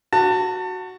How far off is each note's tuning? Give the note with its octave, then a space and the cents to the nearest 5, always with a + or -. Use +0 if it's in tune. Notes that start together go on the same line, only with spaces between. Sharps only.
F#4 +0 A5 +30